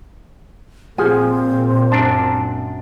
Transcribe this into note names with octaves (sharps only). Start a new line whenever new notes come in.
A#2 F3 C4 G#4 G#5
F#2 D4 A5 A#5